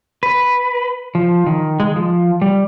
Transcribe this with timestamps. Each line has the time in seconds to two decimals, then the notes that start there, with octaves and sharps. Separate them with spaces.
0.23 B4
1.15 F3
1.46 D#3
1.80 G#3
1.96 F3
2.42 G3